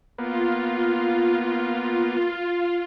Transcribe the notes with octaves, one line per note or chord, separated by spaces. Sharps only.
A#3 B3 F4